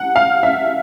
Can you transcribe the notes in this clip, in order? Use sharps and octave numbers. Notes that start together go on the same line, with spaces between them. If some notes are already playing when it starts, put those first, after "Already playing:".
Already playing: F#5
F5
E5